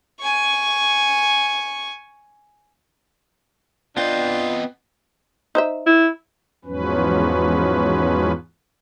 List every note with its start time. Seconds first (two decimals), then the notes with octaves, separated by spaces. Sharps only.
0.21 G#5 C#6
3.97 B3 C4 D4 F4 D#5 G5 G6
5.55 D#4 C5 E5
5.87 E4
6.65 E2 G#2 F3 F#3 C#4 B4